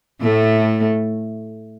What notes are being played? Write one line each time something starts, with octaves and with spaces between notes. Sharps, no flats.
A2 A3